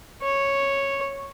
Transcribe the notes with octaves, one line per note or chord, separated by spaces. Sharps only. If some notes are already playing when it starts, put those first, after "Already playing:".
C#5